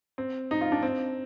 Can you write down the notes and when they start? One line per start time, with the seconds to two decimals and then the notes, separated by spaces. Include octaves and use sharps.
0.18 C4
0.51 D#4
0.61 F4
0.72 D4
0.83 C4